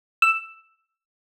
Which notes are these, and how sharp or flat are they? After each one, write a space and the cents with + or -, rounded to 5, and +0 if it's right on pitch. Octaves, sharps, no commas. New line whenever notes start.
E6 +10